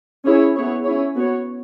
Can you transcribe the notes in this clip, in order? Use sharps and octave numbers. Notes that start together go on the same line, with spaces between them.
C#4 E4 G#4 C#5
B3 E4 G#4 C#5
C#4 E4 C#5
B3 F#4 C#5